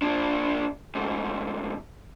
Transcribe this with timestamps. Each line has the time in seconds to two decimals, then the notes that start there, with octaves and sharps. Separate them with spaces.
0.02 A#2 D4
0.95 D2 G#2